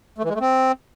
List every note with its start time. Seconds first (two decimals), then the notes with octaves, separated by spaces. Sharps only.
0.18 A3
0.24 E3
0.29 G#3
0.35 A3
0.40 C4